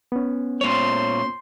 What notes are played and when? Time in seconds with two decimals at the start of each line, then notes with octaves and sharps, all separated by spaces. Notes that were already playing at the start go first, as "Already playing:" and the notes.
0.12 B3 C#4
0.61 A#2 C5 C#5 C6